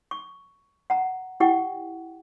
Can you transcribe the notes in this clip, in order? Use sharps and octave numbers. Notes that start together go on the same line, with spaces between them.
C#6
F#5 A#5
E4 G4 F#5 G5 C#6